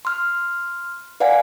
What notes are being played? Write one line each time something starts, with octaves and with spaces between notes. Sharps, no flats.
C6 F6
B4 D5 F5 F#5 G#5